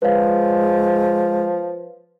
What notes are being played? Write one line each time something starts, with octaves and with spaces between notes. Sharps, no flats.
F3 G#3 B4 C#5 F5